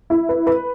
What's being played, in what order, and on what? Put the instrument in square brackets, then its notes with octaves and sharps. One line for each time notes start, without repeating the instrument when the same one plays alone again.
[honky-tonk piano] E4
B4
B4